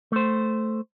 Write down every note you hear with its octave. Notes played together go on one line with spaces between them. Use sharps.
A3 C5